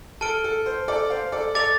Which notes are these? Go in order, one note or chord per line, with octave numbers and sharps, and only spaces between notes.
A4 A5 F6 D7 G7
A4
C5
A4 D5
C5 F5
A4 D5
A4 D5 D6 A6 F7